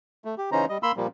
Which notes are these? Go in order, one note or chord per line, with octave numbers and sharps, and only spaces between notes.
A3
G4
C#3 E3 C#4 D#4 C5 A#5
G3 D#5
A#3 B5 C6 E6
A#2 F3 G3 A#3